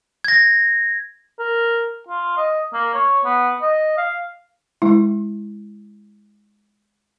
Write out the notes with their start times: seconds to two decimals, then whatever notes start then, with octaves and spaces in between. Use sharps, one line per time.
0.24 G#6 A#6
1.39 A#4
2.09 F4
2.37 D#5
2.73 A#3
2.94 C#5
3.24 B3
3.62 D#5
3.98 F5
4.82 G#3 E4